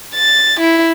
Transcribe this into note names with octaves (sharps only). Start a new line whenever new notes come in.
A6
E4